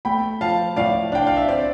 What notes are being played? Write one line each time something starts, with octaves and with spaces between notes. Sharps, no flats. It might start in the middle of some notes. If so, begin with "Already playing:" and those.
A3 G5 B5
F3 F5 A5
A2 D5 F5
D4 G5
F5
E5
C4 D5